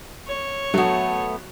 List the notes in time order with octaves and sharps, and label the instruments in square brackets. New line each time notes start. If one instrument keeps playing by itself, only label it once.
[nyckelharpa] C#5
[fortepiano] F#3 [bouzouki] A3 B3